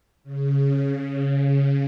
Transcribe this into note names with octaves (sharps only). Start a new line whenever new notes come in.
C#3